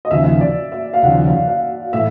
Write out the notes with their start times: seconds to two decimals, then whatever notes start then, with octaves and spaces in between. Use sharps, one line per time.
0.05 D#5
0.11 D#2 C#3 F3 E5
0.41 D5
0.72 E5
0.93 F5
1.02 D#2 C#3 F3 F#5
1.48 F5
1.93 A2 E3 E5